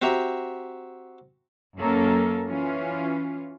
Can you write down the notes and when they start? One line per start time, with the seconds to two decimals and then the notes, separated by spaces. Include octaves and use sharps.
0.02 C4 F#4 G4 E5 A#5
1.78 F#2 A#3 C#4 A4 A#4
2.48 E3 C#4 F4